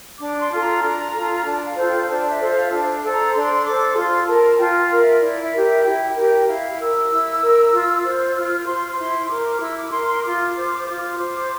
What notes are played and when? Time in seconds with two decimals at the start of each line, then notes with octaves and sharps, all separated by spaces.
0.18 D4 D6
0.41 C6
0.51 F4 A4
0.60 A#5
0.82 D4
1.13 F4 A4
1.44 D4 A5
1.65 F5
1.76 F4 A4 C5
1.87 G5
2.07 D4 A5
2.23 D5
2.29 E5
2.40 F4 A4 C5
2.50 F5
2.71 D4 A5
3.02 A4 C5
3.12 A#5
3.33 D4 C6
3.65 A4 C5 D6
3.96 F4 C6
4.27 A#4 A5
4.58 F4 G5
4.79 F5
4.91 A#4
5.01 E5
5.22 E4 D5
5.43 E5
5.53 G4 A#4
5.63 E5
5.84 E4 G5
6.16 G4 A#4 G5
6.47 E4 F5
6.79 A#4 E6
7.10 E4
7.41 A#4
7.73 F4
8.04 C5
8.36 F4 F6
8.66 C5 C6
8.99 E4 C6
9.29 A#4 D6
9.61 E4 E6
9.77 D6
9.92 A#4 C6
10.08 C6
10.23 F4 D6
10.56 C5
10.86 F4 D6
11.18 C5